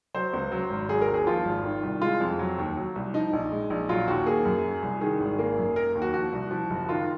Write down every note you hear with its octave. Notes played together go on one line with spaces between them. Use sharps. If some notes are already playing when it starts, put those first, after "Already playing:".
F#3 C5
C#2
F#3
G#1
F#3 G#4
A#4
D#2
G#4
F3 F4
G#1
D#3
C2
G#3 F4
F2
F#3
D#2
F#3
C2
F3 D#4
A#1
G#3
A#1
F#3 F4
D#2 F#4
A#3 G#4
F#2
F#3
C2
D#3 G#4
G#1
A#3
F#2
A#3 A#4
D#2
F#4
F3 F#4
C2
F3
F#1
D#3 F4